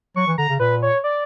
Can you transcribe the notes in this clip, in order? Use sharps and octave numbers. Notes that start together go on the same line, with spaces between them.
F#3 C#6
E3
D3 A#5
C#3
A#2 B4
C#5
D5